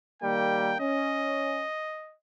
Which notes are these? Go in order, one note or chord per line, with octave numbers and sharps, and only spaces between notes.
D#3 G3 A#3 G5
C#4 D#5